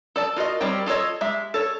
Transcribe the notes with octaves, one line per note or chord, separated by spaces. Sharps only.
A4 D5 A5
F4 F#4 A#4 D#5
G3 C4 A#4 C#5 G5
F4 A4 A#4 C#5 D#5
G#3 G4 E5
A4 C#5